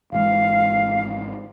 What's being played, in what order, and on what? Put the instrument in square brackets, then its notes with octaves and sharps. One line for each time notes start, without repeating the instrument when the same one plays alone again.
[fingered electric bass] G#1 E3 G#3 [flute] F5